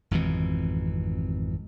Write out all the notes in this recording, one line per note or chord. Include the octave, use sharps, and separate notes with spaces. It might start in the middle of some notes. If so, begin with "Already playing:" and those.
G#1 F2 B2 E3